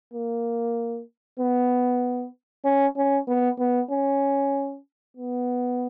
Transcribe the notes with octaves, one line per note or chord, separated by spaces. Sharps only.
A#3
B3
C#4
C#4
B3
B3
C#4
B3